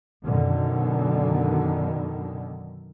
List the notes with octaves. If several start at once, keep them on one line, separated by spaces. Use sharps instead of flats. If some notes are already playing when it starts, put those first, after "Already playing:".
F#2 B2 D3 D#3